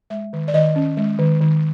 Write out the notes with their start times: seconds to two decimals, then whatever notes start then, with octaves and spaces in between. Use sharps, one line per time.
0.10 G#3 E5
0.33 D#3
0.48 D5
0.54 D#3 D#5
0.76 C#4
0.97 G#3
1.19 D#3
1.41 D#3